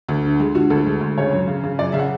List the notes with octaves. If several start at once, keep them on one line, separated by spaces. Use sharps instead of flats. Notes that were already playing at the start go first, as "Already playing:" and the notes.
D2
D3
G#3
D3 F#4
D2 A4
G#3
D2
C#3 C#5
F#2
C#3
C#3
F#2 D5
C#3 E5
F#5